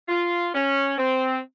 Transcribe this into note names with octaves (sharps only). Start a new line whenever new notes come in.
F4
C#4
C4